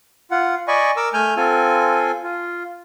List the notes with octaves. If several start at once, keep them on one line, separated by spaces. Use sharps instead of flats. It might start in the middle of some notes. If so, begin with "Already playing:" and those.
F4 F#5
D5 D#5 G#5 B5 C#6
A#4 D6 E6
A3 G#5 F6 G6
C4 F4 A4 G#5
F4